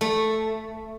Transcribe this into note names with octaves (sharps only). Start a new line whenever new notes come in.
A3